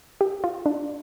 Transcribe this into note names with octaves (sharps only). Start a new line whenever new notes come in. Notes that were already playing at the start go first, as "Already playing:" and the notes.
G4
F4
D4